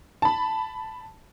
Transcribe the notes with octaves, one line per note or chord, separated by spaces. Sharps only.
A5 B5